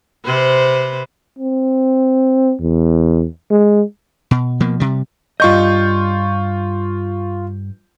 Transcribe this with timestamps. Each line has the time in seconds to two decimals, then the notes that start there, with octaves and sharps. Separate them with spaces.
0.25 C3 B4 C5
1.39 C4
2.60 E2
3.51 G#3
4.31 B2
4.60 B2 F3 A#3
4.80 C3 G3
5.40 G2 F4 D#5 C#6 G6